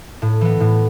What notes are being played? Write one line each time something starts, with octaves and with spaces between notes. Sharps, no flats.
A2
E3 B3
A2